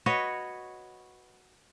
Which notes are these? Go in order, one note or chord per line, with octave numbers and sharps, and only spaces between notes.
F#4 B4 C#5 D#5